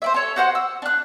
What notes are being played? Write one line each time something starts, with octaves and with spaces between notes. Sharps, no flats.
C5 D5 E5
A4 C#5
F#4 C5 F5 F#5
E6
D4 F#6